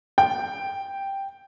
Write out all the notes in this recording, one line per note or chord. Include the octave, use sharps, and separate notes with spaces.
G5